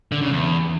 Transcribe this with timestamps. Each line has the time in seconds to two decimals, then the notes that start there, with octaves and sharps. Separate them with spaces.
0.12 D3
0.21 C#3
0.31 E2